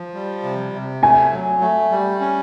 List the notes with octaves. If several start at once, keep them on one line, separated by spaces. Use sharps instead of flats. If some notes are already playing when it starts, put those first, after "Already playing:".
Already playing: F3
G3
C3
C3
A3 G#5
F#3
A3
G3
C#4